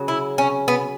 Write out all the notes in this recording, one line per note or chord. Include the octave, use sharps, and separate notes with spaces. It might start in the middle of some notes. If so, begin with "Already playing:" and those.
Already playing: C#3 F#3
E4
C#4
B3